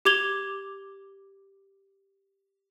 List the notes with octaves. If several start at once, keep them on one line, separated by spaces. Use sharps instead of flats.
G4 D6 G#6 F7 G7